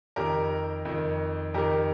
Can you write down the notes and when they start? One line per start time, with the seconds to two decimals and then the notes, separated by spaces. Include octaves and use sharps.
0.16 F2 D#3 G4 A#4
0.85 F2 D#3
1.54 F2 D#3 G4 A#4